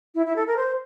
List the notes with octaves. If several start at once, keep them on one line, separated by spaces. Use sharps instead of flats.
E4
E4
A4
A#4
C5